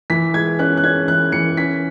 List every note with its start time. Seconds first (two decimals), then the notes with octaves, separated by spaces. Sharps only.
0.10 E3 B6
0.34 G#3 G#6
0.59 C#4 F#6
0.77 F#6
0.84 C#4 G#6
1.08 E3 F#6
1.32 E3 C#7
1.57 C#4 B6